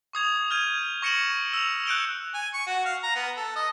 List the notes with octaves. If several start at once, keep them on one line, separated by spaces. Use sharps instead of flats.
C#6 D#6 G#6 F7
D#6 F6 G6 G#6 D#7
C#6 A#6 C#7 D7 E7 F#7
E6 F7
F#6 G6 C#7 D7 E7 G7
G#5
C#6
F#4
F5
A#5
B3
A4
D#5